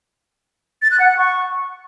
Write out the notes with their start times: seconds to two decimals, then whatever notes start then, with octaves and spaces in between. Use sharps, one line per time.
0.82 A6
0.91 F#6
1.00 F#5
1.08 F#6
1.17 C#6